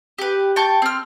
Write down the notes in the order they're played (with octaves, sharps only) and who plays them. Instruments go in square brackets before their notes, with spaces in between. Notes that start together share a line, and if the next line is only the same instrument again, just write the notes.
[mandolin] G4 B4
G5 A5 C#6
C4 F6